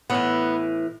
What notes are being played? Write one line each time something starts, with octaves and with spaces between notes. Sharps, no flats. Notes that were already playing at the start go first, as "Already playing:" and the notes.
A2 E3 B3